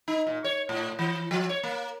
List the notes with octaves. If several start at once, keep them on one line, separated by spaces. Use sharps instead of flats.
D#4
A#2
C#5
A2
E3
F3
C#5
A#3